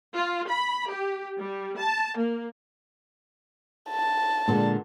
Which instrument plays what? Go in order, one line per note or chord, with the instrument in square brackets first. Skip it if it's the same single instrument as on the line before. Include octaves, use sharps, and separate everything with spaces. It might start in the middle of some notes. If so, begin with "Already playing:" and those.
[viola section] F4
B5
G4
G3
A5
A#3
[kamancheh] A5
[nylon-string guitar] A#2 D3 G#3